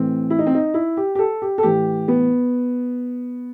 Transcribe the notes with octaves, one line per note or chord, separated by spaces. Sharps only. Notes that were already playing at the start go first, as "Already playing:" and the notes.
Already playing: A2 E3 C4
E4
D#4
C4
D#4
E4
G4
G4
A4
G4
A4
A2 E3 G4
B3